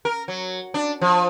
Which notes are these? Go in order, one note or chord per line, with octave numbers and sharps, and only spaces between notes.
A#4
F#3
D4
F3